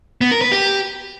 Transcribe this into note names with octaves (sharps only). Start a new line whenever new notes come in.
B3
A#4
B4
G4